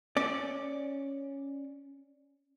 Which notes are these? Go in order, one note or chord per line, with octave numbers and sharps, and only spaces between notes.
C#4 D5